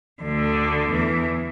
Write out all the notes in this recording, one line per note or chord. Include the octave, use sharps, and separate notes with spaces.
D2 D3
E2 E3